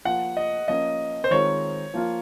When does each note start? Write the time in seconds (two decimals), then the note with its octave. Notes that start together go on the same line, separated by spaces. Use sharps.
0.05 F3 A#3 F4 F#5
0.37 D#5
0.68 F3 A#3 C#4 D#5
1.24 C5
1.31 D#3 G#3 C4 F4 A#4 C#5
1.94 F3 A#3 F4